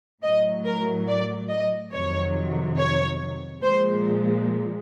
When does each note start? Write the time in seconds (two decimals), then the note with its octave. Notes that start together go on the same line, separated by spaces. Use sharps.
0.23 A2 F#3 D#5
0.65 A#4
1.07 D5
1.50 D#5
1.92 F2 C3 D#3 F#3 C#5
2.77 C#5
3.62 A#2 F3 G#3 C5